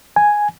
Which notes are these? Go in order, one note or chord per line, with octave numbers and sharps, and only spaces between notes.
G#5